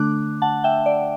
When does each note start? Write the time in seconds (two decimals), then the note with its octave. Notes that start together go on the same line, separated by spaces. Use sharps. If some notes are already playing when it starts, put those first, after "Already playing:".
Already playing: D3 A3 D4 D6 F#6
0.42 F#5 A5
0.64 E5 G5
0.86 D5